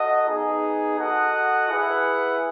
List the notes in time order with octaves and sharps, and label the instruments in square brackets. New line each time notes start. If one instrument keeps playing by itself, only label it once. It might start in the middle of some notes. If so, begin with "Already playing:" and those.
Already playing: [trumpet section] F#4 A4 D#5 F#5
B3 D#4 G#4
F#4 A4 D#5 F#5
E4 G#4 B4 F#5